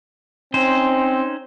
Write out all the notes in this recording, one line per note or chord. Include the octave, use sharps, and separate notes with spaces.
C4 C#4 D#4 C5